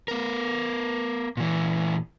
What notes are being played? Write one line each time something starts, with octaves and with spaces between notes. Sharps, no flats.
B3 A#4
A#2 E3